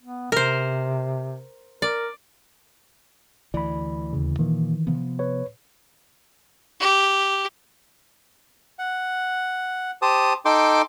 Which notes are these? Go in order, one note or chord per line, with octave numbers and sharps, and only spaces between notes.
B3
C3 A#4 C5
A#4 D5
D2 E3 D5 B5
D#2 C#3
A#2 D#3 E3
C3 F3 B3
B4 C#5
G4
F#5
G4 C5 A5 D#6
D#4 A4 G5 C6 D6